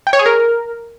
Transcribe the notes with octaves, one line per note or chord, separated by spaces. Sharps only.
G5
C#5
G#4
A#4